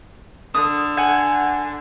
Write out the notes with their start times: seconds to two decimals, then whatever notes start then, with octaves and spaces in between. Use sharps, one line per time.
0.54 D3 D#6
0.97 F#5 G#5